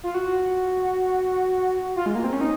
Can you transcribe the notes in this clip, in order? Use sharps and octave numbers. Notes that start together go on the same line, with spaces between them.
F4
F#4
F4
G#3
A#3
C4
C#4
D#4